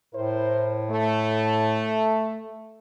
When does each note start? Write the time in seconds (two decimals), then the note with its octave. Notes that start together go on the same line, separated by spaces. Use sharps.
0.14 A2 E4 A#4 C5
0.91 A3